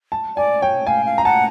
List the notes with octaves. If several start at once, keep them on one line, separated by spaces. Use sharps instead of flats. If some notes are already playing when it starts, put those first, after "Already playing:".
A5
D5 G#5
C#5 G5
F5 G#5
F5
A#5
F#5 A5